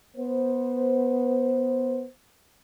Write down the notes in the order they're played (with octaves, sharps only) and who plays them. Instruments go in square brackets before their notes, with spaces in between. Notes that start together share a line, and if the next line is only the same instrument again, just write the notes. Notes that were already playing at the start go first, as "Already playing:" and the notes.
[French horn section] B3 C5